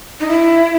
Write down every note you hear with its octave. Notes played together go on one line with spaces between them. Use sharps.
D#4
E4